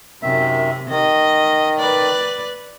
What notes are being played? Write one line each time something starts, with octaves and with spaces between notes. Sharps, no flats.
F#2 C3 D#3 E5
D#3 D#5
B4 D5